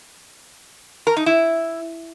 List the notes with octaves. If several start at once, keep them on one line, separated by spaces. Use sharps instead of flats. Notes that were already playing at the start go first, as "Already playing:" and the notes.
A#4
D#4
E4